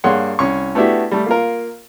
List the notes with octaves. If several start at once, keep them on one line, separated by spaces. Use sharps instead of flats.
G2 A#3 G#4 C#5 F#5 C6
C2 C#4 C#6
A3 B3 D4 E4 F#4 G4
G3 A3
A#3 F4 A#4